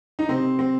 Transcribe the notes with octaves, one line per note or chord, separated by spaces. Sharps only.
D#4
C3 C4
C4